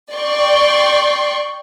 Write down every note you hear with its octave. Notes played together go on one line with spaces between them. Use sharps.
D5 G5 C6 C#6